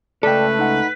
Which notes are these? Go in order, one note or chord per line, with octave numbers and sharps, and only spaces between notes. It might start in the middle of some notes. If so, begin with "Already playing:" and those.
C#2 A3 A4 B4 D5 G5
D#4 F#5